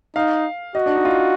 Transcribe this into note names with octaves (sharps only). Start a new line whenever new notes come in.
D#4 F5
F#4 D#5
D4
D#4
F4